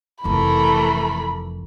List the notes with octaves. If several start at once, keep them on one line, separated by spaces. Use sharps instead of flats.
F1 F2 E3 A3 A#4 B5